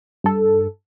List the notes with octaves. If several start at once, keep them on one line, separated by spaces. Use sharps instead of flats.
G2 A4